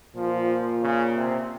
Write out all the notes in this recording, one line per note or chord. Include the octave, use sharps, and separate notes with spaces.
A#2 F3
C#3
C3